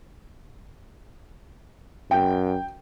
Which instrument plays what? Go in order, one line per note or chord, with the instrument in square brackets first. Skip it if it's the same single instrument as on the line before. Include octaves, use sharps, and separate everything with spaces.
[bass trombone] F#2 [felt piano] G5